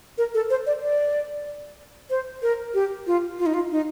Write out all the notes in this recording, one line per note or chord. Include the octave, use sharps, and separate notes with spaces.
A#4
A4
C5
D5
D5
C5
A#4
G4
F4
F4
D#4
F4
D#4